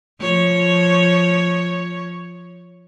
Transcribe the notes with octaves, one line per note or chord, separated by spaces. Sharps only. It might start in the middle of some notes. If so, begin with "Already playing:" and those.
F3 C#5